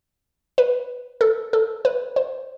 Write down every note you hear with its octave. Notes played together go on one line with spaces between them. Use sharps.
B4
A4
A4
B4
C5